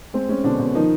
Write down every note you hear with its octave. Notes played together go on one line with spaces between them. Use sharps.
G#3 C4
G#3 C#4
B2 D3 D4
B2
D#3 F3 D#4